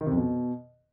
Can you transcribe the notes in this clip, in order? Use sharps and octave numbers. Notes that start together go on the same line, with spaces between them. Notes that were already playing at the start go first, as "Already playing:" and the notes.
D#3
C3
F2
B2